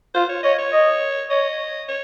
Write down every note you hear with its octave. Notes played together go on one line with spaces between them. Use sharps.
F4 C5
C#5
C#5 D#5
C#5
D#5
C#5 D#5
C#5